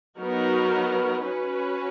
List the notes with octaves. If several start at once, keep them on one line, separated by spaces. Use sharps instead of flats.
F#3 B3 D#4 F#4 A#4
C#4 F#4 B4